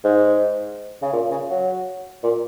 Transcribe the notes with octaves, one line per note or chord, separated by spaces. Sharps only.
G#2
C#3
A#2
C#3
F#3
A#2